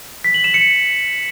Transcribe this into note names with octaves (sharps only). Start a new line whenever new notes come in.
B6
F#7
E7
C#7